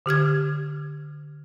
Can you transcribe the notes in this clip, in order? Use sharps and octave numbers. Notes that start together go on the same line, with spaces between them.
D3 G4 F6 G#6